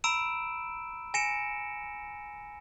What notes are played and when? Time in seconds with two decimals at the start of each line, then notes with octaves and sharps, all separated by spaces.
0.04 A#5 B5 E6 D7 E7
1.14 G#5 A#6 C#7 D7 E7